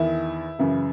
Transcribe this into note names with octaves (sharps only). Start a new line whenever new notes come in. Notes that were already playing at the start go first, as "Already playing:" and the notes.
Already playing: E2 D#3 E4
F#2 C#3 E3